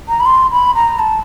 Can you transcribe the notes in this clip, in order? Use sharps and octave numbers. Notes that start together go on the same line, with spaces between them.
A#5
B5
C6
B5
A#5
A5